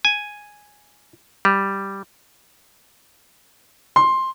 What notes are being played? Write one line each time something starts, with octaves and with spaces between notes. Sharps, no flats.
G#5
G3
C6